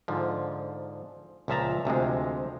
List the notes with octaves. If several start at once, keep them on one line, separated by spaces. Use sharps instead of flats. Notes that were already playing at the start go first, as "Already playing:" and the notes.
G#2 D3 F3
C#2 A#2 F3 E5 A5 A#5
D2 C3 F3 G#3